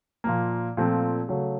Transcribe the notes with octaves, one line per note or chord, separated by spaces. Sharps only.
A#2 F3 A#3
A#2 F3 A3 C4
C#3 F#3 A3